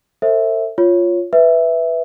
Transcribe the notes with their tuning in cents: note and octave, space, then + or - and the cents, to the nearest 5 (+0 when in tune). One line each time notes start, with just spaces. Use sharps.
A4 +40 C5 +20 E5 +0
F4 +0 C#5 +0
B4 +0 E5 +0